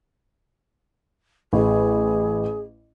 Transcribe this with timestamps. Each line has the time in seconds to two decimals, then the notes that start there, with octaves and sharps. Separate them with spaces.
1.53 A1 G#4